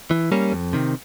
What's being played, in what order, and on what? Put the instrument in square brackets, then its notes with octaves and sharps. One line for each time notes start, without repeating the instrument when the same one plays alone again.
[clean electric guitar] E3
G3 A#3 C#4
F2
C3 D#3